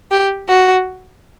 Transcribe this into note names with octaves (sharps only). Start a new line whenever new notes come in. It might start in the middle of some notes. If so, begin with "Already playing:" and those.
G4
F#4